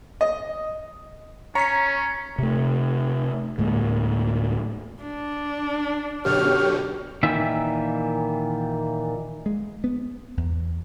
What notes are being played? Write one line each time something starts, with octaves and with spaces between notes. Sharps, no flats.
D#5
C#4 C#5 A#5 B6
C3 A3
D2 A2 G#3 A#3
D4
F#2 B2 D3 G4 C#5 F6
A#2 D#3 E3 E5
G#3
B3
E2